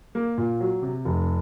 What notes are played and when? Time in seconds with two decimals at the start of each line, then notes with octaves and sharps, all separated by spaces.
0.15 A#3
0.38 A#2
0.60 F#3
0.82 C3
1.05 F1